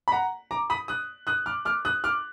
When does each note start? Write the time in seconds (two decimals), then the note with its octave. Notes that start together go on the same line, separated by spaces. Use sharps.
0.08 B5
0.12 F#5 A#5
0.51 A#5 D6
0.70 B5 D#6
0.88 D#6 F#6
1.27 D#6 F#6
1.46 D6 F6
1.65 D6 F6
1.85 D#6 F#6
2.04 D6 F6